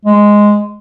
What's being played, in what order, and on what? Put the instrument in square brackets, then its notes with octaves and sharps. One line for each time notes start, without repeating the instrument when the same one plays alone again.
[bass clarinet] G#3